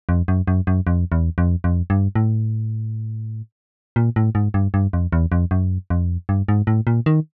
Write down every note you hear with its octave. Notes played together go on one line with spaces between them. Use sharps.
F2
F#2
F#2
F#2
F2
E2
F2
F2
G2
A2
A#2
A2
G#2
G2
G2
F2
E2
F2
F#2
F2
G2
G#2
A2
A#2
D#3